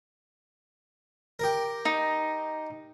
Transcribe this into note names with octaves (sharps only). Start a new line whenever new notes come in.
G4 A#4
D#4